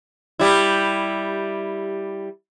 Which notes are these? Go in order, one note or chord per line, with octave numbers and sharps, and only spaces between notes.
G3 E4